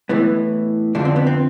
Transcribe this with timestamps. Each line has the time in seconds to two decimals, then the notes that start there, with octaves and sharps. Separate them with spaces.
0.09 A2 E3 B3
0.95 F2 D3 F3 D4
1.05 C4
1.16 B3
1.27 C4